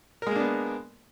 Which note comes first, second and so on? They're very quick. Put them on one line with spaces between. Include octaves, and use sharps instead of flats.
A#4 G#3 A#3 D4 B3